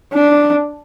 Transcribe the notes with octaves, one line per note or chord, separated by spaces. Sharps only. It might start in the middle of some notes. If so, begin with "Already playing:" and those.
D4